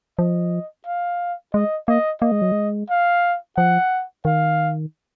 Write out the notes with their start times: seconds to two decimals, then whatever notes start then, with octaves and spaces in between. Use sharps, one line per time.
0.19 F3 D#5
0.87 F5
1.54 G#3 D#5
1.88 A#3 D#5
2.22 A#3 D#5
2.32 G#3
2.42 F#3
2.52 G#3
2.90 F5
3.57 F3 F#5
4.25 D#3 F5